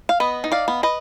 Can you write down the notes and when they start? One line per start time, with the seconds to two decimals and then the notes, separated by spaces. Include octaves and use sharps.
0.09 F5
0.20 B3 B4 D#5
0.44 D#4
0.52 D5 F5
0.68 B3
0.83 B4 D#5